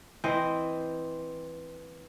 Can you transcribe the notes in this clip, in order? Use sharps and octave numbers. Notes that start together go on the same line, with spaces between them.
E3 C4 C5 D#5